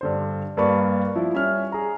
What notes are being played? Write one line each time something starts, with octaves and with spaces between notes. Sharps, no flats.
G2 D3 C5
G2 G3 A#3 B4 D5 C#6
F3 E4
G3 C#4 E5 F6
G#4 A#5